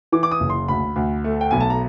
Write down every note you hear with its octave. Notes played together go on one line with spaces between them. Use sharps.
E3 D6
D6
D#6
F#1
C6
D2 B5
D2
A3
G5
B1 G#5
A5
A#5